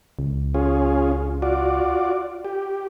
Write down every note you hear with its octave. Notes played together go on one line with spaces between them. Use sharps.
C#2
C#4 F4 G#4
F4 F#4 D5
G4